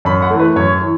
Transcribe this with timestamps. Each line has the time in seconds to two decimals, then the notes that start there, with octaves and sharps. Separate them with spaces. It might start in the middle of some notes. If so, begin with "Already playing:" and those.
0.05 F#2 B5
0.22 F#5
0.30 E3 A3
0.39 B4
0.56 F#2 C#5
0.81 E3